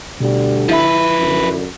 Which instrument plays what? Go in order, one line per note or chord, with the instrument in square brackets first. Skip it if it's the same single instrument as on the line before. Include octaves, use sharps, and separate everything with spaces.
[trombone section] D2 D3 G3 [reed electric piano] B2
[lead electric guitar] F3 B4 [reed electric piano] E4 E5
[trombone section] F#2 D3